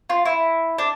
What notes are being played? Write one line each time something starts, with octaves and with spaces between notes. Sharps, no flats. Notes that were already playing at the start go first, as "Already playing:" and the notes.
F4
E4
D4